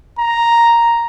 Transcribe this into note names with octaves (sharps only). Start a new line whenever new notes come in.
A#5